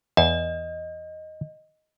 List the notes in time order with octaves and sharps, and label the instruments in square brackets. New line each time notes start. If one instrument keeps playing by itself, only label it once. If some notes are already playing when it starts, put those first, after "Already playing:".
[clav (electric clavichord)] E2 [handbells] D#5